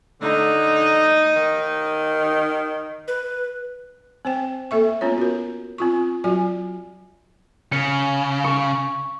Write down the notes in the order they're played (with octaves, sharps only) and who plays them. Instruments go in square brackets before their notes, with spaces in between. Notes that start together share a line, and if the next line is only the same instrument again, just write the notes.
[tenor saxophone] D3 [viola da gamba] D#4
[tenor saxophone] D#3
[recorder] B4
[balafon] C4 C5 G5
A#3 A4 E5 C#6
A#3 B3 C#4 F4 C#5
F#4 A#4
C4 F4 C#6
F#3 F4 F#4 D5 G#5
[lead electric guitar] C#3 [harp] C#7
[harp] C#6